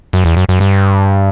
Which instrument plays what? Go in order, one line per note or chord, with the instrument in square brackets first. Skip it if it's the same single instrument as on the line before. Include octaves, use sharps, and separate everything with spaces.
[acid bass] F#2
E2
F#2
F#2
G2